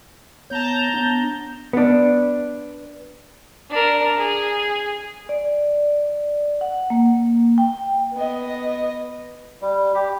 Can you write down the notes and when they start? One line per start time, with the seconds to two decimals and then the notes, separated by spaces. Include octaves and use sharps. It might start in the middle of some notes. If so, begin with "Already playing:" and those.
0.50 B3 C#5 A5 A#5 G6
0.94 B3 D4
1.73 B3 D4
3.70 D4 A#4
4.17 G#4
5.29 D5
6.61 F#5
6.90 A#3
7.58 G5
8.13 B3 D#5
9.62 G3
9.94 G4